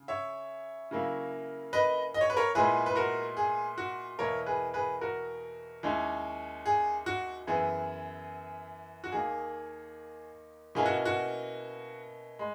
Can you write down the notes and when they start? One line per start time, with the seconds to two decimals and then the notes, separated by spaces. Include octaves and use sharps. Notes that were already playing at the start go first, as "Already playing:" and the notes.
Already playing: C#3
0.08 C#5 E5
0.91 C#3 F#3 A#3 E4
1.73 B4 D#5
2.14 D#5
2.21 C#5
2.30 B4
2.37 A#4 C#5
2.55 A#2 G#3 B3 E4 G#4 B4
2.86 B4
2.95 F#4 A#4
3.37 G#4
3.78 F#4
4.19 E2 B2 A#3 E4 A#4 C#5
4.46 G#4 B4
4.74 G#4 B4
5.01 F#4 A#4
5.83 D#2 D#3 G#3 C#4 E4
6.66 G#4
7.06 F#4
7.47 F#2 E3 B3 E4 G#4
9.04 F#4
9.11 D#2 D#3 A#3 G#4
10.75 B2 A#3 C#4 E4 G#4
10.86 F#4
11.05 F#4
12.39 G#3